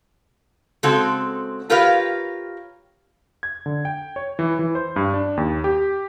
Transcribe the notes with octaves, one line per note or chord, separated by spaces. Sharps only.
C#3 G#3 C4 F#4 A4
F4 G4 A#4 B4 C#5 F5
G#6
D3
G5
C#5
E3
E3
C5
G2
D4
D#2
G4